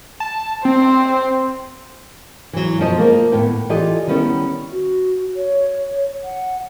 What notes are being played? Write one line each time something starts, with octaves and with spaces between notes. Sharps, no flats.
A5
C4 C5
E3 F#3
F#2 B2 F3 C5 D#5
A#3 F4 A#4 C5
D#2 A2 B3 G5
E3 F4 G4 A4 D5 D#5
D#3 G3 B3 C#4 E4
F#4
C#5
F#5